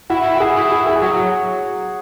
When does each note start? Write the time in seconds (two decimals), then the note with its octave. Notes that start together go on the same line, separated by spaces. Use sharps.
0.10 E4 F#4
0.35 F#4
0.40 G#4
0.57 E4
0.72 G#4
0.87 G#4
1.02 F#3 F#4